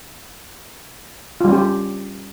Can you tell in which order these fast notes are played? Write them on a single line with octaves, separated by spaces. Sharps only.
F4 G3 C#4 G4